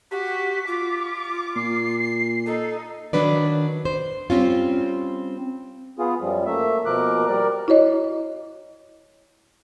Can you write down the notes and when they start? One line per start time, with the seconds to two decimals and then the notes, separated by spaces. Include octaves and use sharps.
0.11 F#4 G4 B6
0.67 F4 D6
1.56 A#2 C7
2.46 D#4 A4
3.13 D#3 F#3 D4 B4 D5
3.85 C5
4.30 G3 C4 C#4 F4
5.99 B3 F4 G#4
6.20 F#2 F3 G3
6.46 A3 A#3 E5
6.86 B2 F3 A#3 A#4 D6 F#6
7.28 G3 A#4 D5
7.68 E4 F#4 C#5 D#5